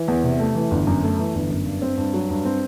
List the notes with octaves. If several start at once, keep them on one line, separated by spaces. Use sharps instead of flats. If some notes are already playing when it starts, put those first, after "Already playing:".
Already playing: E3
E2
C3
A3
E3
G1
F#2
A3
E3
G1
F#2
G2
C4
G2
F#3
G2
C4